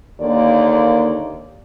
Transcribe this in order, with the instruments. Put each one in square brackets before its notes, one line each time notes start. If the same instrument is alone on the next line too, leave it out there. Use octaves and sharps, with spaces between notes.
[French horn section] D#2 D3 A#3 D5